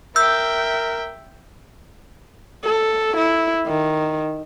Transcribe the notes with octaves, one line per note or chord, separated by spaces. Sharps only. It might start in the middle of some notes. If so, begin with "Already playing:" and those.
A#4 E5 G5 E6 G6
A4
E4
D#3